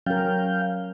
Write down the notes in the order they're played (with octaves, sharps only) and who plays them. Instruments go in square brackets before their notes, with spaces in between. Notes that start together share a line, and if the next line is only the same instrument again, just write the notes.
[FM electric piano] F#3 [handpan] C#4 A#4 [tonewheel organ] F5 G5